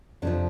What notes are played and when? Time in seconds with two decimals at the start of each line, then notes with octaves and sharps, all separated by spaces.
0.22 F2 C3 F3 D4